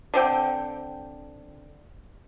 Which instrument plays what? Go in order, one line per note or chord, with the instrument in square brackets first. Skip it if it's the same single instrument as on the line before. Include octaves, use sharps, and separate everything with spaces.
[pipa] D3 C4 G5